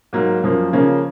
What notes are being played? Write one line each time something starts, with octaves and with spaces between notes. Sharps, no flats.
G#2 F#3 A#3
F#2 F3 A#3
C#3 F3 A#3 C#4